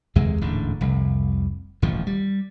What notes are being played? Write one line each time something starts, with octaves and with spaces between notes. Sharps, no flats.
F1 D#2 C3 G#3
D1 A1 G#2 D3
F1 C2
D#1 A1 D#3 F3
G3